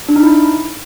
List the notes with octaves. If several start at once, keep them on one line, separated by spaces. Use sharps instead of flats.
D4
D#4
E4